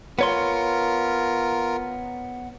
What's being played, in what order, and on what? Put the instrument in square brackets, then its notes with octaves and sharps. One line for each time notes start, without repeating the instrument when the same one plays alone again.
[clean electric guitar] B3 C#5 C6 [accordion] F4 A#4